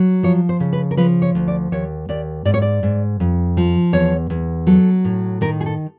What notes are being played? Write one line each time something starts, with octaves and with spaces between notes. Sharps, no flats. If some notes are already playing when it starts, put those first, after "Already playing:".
Already playing: F#3
F3 C#5
C5
C#3
B4
A#4
F3 B4
C#5
D2
D5
D#2 C#5
D#2 D5
G#2 D5
C#5
D5
G#2
F2
F3
E2 C#5
E2
F#3 A4
A2
D#3 A#4
G#4
A4